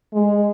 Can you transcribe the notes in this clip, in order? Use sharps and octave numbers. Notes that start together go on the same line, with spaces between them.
G#3